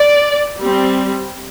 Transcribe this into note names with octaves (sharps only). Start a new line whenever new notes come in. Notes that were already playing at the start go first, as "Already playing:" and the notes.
Already playing: D5
G3 C4